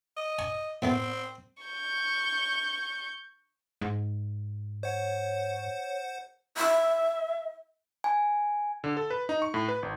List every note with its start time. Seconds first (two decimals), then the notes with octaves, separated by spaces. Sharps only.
0.17 D#5
0.39 G#5 C#6
0.82 A2 A3 B3 C4
1.63 C#6 G6
3.81 G#2
4.83 C5 C#5 F#5
6.56 E5
8.04 G#5
8.84 D3
8.97 A4
9.10 B4
9.29 D#4
9.42 C#6
9.54 A2
9.68 B4
9.83 G#1